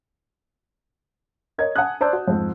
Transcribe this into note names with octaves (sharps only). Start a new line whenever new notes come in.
A#4 C#5 D#5 G#6
F#5 G#5 A5 D#6 F#6
C5 D5 A5 E6 G6
F#4
F2 G#2